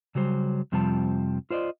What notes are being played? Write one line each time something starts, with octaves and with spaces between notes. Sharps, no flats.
C#3 F#3 G3 C5
F2 C3 F3 G3 C4 A5
F4 C5 D5 D#5